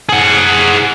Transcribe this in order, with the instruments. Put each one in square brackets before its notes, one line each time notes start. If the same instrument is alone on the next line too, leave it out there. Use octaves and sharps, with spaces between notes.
[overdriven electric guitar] G#4 F#5